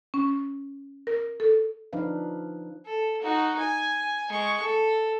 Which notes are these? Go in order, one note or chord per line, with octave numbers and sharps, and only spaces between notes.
C#4
A#4
A4
F3 D4 D#4 B4 F5
A4
D#4 F#4
G#5
G#3 C#6
A4